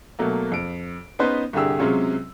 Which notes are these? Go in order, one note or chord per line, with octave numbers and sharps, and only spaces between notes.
B2 F#3 A3 A#3
F2 D7
B3 C#4 D#4 B4 C5
C2 G2 D3 G4 G#4 E6
C3 F#3 G#3 C#4 F4